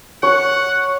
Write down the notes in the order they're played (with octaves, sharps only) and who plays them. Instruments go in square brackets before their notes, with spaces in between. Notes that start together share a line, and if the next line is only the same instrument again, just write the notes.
[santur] C#5 [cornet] F#5